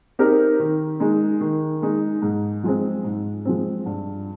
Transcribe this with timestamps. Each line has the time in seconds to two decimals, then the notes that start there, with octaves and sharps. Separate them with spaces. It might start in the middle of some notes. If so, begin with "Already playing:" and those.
0.19 C4 D#4 G4 A#4
0.59 D#3
1.00 G#3 D#4
1.40 D#3
1.82 G#3 D#4
2.22 G#2
2.64 F3 G#3 C4
3.04 G#2
3.45 F3 G#3 C4
3.86 G2